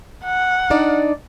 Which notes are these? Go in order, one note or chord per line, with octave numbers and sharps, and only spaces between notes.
F#5
D4 D#4 D5